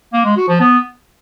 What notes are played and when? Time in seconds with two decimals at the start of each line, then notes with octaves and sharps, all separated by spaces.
0.13 A#3
0.25 G#3
0.37 F#4
0.48 F3
0.60 B3